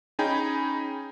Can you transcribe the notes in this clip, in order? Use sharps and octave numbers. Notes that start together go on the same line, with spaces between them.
C#4 D#4 G#4 G5 G#5 B5